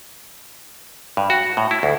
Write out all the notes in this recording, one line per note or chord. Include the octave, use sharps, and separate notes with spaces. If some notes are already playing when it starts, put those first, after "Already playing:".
G2
F#4
A2
E4
D2